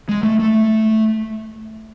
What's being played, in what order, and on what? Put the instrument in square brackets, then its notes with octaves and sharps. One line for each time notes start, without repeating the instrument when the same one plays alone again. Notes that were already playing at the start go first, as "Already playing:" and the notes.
[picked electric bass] G#3
A3
A3